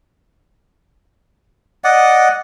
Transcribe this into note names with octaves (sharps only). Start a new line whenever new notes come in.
D5 D#5 F#5